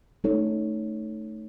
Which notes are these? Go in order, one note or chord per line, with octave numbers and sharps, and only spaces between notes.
A3 D#4 A4 C#5